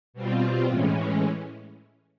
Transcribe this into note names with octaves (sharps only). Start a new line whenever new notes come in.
B2 G3 C4 F4
A2 E3 G#3 C#4